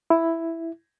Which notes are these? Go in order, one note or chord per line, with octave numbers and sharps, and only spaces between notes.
E4